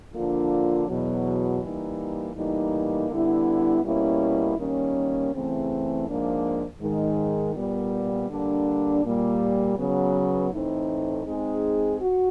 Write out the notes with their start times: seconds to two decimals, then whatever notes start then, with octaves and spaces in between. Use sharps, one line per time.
0.13 D3 F3 A#3 D4 F4
0.87 E2 B2 F#3
1.61 E3 G3 A#3 D#4
2.36 A2 E3 G3 A#3 D#4
3.10 D3 G3 B3 E4
3.84 B2 G3 A#3 C#4 E4
4.57 D#3 G3 A#3 C#4
5.32 E2 C#3 E3 A3 C4
6.06 G#2 F3 A#3 D4
6.80 G#2 D#3 G#3
7.54 A#2 G3 B3
8.28 D3 G3 A#3 D4
9.03 A#2 G3 A#3
9.77 C#3 F#3 B3
10.51 A2 E3 A3 C4 D#4
11.25 G#3 C4 D#4 G#4
12.00 F#4